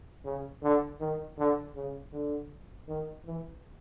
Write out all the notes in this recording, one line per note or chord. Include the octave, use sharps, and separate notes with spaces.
C#3
D3
D#3
D3
C#3
D3
D#3
E3